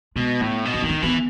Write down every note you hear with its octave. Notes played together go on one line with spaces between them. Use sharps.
B2 G#3
A2 B3
B2
C#4
D#3 B3
C#4
E3 B3